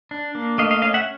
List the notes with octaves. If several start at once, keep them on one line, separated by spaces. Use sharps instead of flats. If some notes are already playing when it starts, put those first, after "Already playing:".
D4
A#3
A3 D#5 F5
D#5 F5
C#4 D#5 F5
E5 F#5